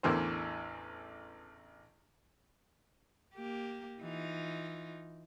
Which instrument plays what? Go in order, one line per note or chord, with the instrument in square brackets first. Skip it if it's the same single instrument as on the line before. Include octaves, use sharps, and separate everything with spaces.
[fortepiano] A1 E2 D3 E3 A#4 C5
[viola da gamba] A#3 G4
E3 D#4 F4